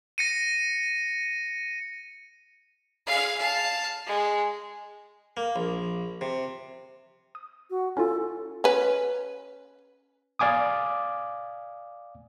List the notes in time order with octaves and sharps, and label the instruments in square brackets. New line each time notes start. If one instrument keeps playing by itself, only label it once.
[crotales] A#6 C#7 D#7
[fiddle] G#4 F5
F5 A5
G#3
[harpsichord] A#3
A#1
C3
[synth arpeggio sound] D#6
[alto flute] F#4
[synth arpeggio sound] C#4 E4 F4 [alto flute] A4
[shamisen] C#4 B4
[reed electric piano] D5 F5 G#5 D6 D#6